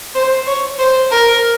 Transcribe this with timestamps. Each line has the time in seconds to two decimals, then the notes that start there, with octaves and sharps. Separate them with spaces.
0.15 C5
0.47 C#5
0.79 C5
1.11 A#4